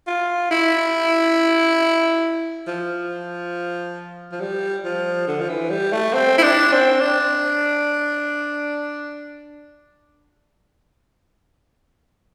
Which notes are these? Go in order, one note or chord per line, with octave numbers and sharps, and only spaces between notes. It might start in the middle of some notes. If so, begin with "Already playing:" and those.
F4
E4
F3
F3
G3
F3
D3
F3
E3
G3
A3
C4
E4
D4
C4
D4